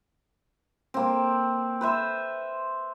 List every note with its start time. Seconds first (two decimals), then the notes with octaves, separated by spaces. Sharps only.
0.94 A#3 C4
1.81 B4 C5 E5